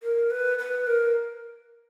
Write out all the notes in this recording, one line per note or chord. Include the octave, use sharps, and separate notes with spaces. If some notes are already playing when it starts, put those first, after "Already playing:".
A#4
B4
B4
A#4